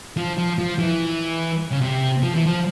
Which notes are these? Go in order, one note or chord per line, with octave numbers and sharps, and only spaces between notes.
F3
F3
F3
E3
C#3
C3
F3
E3
F3